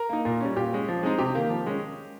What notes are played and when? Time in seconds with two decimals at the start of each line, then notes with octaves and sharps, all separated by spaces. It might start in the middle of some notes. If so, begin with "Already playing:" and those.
Already playing: A#4
0.09 A#3 D#4
0.25 A#2
0.40 G3 C#4
0.56 A#2 G4
0.73 G#3 C#4
0.88 F3
1.03 G#3 C4 D#4
1.18 C3 G4
1.35 D#3 A#3
1.50 F3
1.66 G#3 C#4